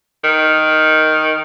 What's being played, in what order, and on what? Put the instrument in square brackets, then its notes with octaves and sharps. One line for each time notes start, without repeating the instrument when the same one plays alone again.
[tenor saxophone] D#3